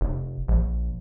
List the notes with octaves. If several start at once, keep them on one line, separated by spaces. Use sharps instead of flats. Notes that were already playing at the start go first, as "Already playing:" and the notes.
F1
A#1